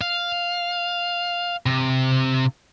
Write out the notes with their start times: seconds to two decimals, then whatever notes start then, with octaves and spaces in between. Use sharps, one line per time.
0.01 F5
1.66 C3